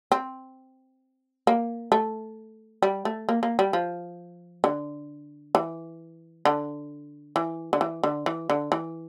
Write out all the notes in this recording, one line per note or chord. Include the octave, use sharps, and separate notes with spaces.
C4
A#3
A3
G3
A3
A#3
A#3
G3
F3
D3
E3
D3
E3
D3
E3
D3
E3
D3
E3